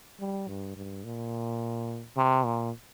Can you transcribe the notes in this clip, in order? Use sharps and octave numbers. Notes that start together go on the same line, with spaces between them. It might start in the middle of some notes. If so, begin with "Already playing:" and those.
G3
G2
G2
A#2
C3
A#2